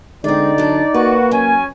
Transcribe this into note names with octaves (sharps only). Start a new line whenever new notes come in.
D3 G#3 C4 D#4 D5
F#3 D4
A#3 F#4 B4
F#3 C#4 G#5